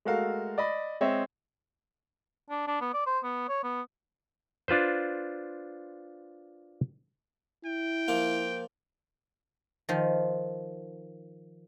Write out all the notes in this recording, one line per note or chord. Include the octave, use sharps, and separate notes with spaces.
G#3 A3 F#4 A4 A#4 F5
D5 D#5 B5
G#3 C4 C#5 D#5 E5
D4
D4
B3
D5
C5
B3
C#5
B3
D4 F4 B4 C5
E4 G5
F3 A#3 F4
D#3 F3